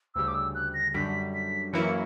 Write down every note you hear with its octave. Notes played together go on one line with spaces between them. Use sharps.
D2 C#3 G3 E6
D6
E6
F#6
A#6
F#2 D3 G3 B6
B6
F#2 E3 A#3 E4 C#7